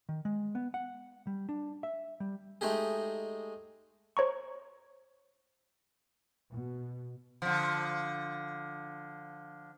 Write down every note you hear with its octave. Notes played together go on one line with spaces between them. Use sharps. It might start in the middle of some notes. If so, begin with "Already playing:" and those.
D#3
G#3
B3
F#5
G3
D4
E5
G3
G#3 A3 D#4 G4 G#4
C5 C#5 A#5 C#6
B2
D3 F3